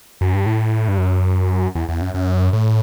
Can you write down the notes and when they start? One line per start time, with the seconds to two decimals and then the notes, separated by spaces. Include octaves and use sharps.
0.21 F#2
0.34 G2
0.46 A2
0.88 G2
0.98 F#2
1.75 E2
1.89 E2
2.02 F#2
2.14 F#2
2.53 A2